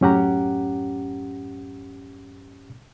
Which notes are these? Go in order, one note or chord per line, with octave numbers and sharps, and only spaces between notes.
F#2 A2 C#4 G4 F#5 A#5